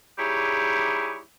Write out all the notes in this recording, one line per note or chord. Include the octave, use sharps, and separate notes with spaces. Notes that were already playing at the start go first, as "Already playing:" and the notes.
G3 D#4 E4 G4 G#4 C#5